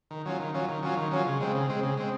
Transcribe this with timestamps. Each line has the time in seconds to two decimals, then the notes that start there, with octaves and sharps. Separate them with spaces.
0.11 D#3
0.25 F#3 C#4 F4
0.39 D#3
0.54 F#3 C#4 F4
0.68 D#3
0.83 F#3 C#4 F4
0.97 D#3
1.11 F#3 C#4 F4
1.26 C#3
1.40 G#3 C4
1.55 C#3
1.69 G#3 C4
1.83 C#3
1.97 G#3 C4